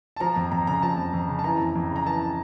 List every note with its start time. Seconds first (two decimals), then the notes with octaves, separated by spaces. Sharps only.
0.16 A5
0.20 F3 A#5
0.36 F2
0.51 F2 A#5
0.67 C#3 A#5
0.83 F3 A5
0.98 F2
1.13 F2
1.29 C#3
1.39 A5
1.44 E3 A#5
1.60 F2
1.75 F2
1.90 C#3
1.96 A#5
2.06 E3 A5